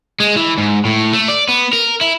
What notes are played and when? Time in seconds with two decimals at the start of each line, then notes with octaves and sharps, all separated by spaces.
0.20 G#3
0.36 E3
0.58 G#2
0.85 A2
1.13 A3
1.28 D5
1.48 B3
1.73 A#4
2.01 E4